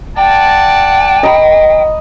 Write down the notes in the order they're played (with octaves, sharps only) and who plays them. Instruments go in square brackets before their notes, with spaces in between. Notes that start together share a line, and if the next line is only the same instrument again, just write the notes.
[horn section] D5 F#5 A5 [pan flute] G5
[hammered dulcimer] D#5 A#5 B5